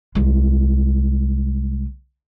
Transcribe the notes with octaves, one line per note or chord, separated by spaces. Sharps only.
C2 G#3